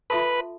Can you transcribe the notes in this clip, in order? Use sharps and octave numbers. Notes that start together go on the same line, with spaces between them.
F4 A4 B4 E5 A5 C6